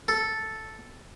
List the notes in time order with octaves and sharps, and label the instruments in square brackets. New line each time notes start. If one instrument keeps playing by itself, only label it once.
[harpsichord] A4